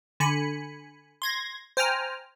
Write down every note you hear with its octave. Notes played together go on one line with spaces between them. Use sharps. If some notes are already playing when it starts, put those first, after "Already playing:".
D3 G#5 B5 C#7
C6 G#6 A#6
C5 G5 G#5 A#5 F6